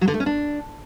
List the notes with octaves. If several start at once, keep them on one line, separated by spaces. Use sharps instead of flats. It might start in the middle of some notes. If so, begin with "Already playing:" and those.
F#3
D3
A3
C#4
D4